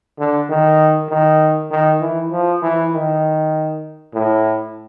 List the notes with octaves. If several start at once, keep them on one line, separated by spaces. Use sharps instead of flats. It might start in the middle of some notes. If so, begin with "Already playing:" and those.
D3
D#3
D#3
D#3
E3
F3
E3
D#3
A2